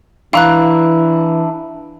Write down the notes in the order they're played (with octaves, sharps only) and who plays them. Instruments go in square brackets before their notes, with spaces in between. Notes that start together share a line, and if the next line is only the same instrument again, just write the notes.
[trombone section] E3 [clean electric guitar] D4 E4 [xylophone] F5 A#5 F#6